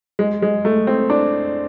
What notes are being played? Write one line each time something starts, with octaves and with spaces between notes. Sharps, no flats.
G#3
G#3
A3
C4
D4